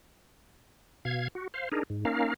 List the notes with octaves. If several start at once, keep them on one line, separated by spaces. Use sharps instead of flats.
B2 F5 G#6
F#4
C5 F5
D4 D#4 G#4 A#4
G#2
A#3 C#4 D#4 A#4 F5